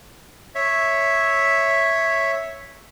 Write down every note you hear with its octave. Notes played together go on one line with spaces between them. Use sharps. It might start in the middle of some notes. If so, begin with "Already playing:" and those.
C#5 E5